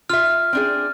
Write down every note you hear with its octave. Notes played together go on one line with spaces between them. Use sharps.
F4 E5 F6
C4 D4 G#4